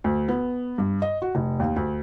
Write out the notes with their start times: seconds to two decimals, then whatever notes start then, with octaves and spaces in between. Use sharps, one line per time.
0.04 D2
0.28 B3
0.78 G2
1.02 D#5
1.22 F#4
1.35 F1
1.60 D#2
1.76 D2